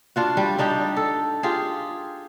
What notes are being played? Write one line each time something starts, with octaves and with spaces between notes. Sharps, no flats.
D4 F4 F#4
G3
G3 D4 D#4 G4
A4
F4 G4 G#4